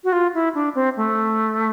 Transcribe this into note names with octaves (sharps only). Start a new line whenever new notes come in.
F#4
F4
E4
D4
C4
A3